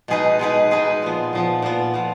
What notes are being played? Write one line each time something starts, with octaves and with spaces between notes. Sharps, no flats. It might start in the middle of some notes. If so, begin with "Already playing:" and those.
B2 G#3 D#4 G#4 B4
B2 G#3 D#4 G#4 B4
B2 G#3 D#4 G#4 B4
A#2 F3 B3
A#2 F3 B3
A#2 F3 B3
A#2 F3 B3